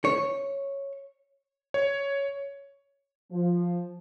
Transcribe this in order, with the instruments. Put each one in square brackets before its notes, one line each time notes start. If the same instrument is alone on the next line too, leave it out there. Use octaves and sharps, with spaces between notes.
[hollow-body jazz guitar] C#5
[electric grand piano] C#5
[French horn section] F3